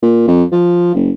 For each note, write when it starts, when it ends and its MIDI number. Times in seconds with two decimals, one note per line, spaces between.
0.02 0.25 46
0.28 0.44 41
0.52 0.94 53
0.95 1.10 30